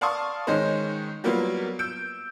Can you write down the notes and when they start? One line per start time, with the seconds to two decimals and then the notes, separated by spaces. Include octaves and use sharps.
0.01 D5 F5 A5 C6 C#6 D#6
0.47 D#3 G#3 C#4 D#4 C5
1.24 F#3 G3 A#3 B3 F4
1.79 E6 G6 D7